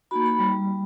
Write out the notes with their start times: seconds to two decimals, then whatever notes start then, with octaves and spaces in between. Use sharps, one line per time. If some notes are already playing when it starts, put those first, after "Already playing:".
0.11 A#3 D#4 F#4 B5
0.26 B5
0.39 G3